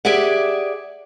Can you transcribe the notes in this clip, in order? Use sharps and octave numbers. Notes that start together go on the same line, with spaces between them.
G4 G#4 D5 E5 F#5